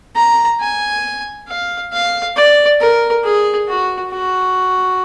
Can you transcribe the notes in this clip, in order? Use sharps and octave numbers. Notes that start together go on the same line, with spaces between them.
A#5
G#5
F5
F5
D5
A#4
G#4
F#4
F#4